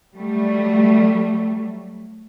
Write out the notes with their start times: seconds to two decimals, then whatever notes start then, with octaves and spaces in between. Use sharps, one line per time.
0.16 F#3 G3 A3